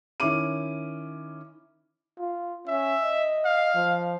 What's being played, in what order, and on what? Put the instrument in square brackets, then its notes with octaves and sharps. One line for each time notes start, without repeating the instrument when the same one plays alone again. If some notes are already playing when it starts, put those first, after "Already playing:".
[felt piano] D#3 C#4 E4 D6 D#7
[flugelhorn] F4
[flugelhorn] C#4 [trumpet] E5
[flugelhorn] D#5
[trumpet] F5
[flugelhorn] F3